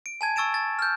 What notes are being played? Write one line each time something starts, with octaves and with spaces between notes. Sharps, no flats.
D7
G#5 A5 G#6
C#6 E6 A6 D7 E7
A6
F6 G6